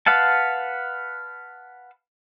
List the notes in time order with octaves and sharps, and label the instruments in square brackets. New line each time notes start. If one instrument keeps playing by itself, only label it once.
[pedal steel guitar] B4 F5 F#5 A5